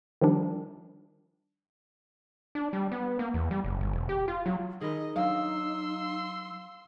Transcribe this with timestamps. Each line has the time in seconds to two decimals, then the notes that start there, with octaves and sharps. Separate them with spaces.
0.22 D#3 F3 G3 D4
2.55 D4
2.73 G3
2.92 B3
3.19 A#3
3.34 E2
3.51 G3
3.64 F#1
3.81 G1
3.93 E1
4.09 G4
4.28 F4
4.46 F#3
4.81 D#3 D#4 G#4 A#4 D#5 B5
5.16 F#3 D4 F5 C6 E6